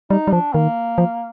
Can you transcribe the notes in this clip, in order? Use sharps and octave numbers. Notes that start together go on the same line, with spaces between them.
G3 D#4
G3
F3 D4
D#3 A#3
F3